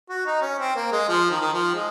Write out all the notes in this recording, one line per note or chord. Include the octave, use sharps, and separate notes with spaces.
F#4
D#4
C#4
C4
A#3
G#3
F3
D#3
D#3
F3
G#3